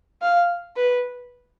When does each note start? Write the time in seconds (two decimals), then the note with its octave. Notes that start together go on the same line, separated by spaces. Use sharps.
0.22 F5
0.76 B4